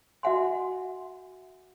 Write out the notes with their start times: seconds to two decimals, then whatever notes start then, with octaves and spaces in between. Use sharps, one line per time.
0.23 F#4 D#5 E5 F#5 G#5 C6